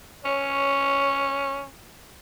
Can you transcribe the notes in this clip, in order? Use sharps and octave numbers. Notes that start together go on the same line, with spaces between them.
C#4 C#5